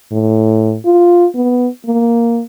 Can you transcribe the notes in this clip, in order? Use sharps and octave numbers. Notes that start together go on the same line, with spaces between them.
A2
F4
B3
A#3